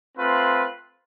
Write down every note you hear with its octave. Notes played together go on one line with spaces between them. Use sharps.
A3 C4 F4 B4